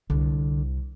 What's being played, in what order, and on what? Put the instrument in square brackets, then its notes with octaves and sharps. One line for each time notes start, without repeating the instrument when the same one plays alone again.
[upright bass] C2 [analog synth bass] D3